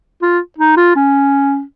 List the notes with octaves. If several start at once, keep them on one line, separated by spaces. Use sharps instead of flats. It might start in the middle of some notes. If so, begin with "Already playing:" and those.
F4
D#4
F4
C#4